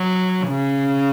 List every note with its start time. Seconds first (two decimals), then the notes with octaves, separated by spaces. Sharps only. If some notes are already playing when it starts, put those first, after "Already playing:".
Already playing: F#3
0.48 C#3